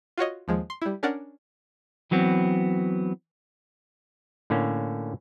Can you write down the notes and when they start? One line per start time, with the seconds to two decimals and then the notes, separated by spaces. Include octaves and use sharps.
0.17 F4 F#4 C#5 D#5
0.48 D#2 F3 G#3
0.70 C6
0.82 G3 E4
1.03 C#4 D4 A#4 D5 F#5
2.11 E3 F#3 B3 C4
4.50 A2 D3 A#3 C#4